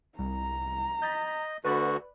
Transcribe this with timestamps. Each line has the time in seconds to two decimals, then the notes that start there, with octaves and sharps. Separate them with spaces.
0.19 C2 A#5
1.02 D#5 G6 A6 B6
1.65 D2 D3 F#4 B4 D5 B5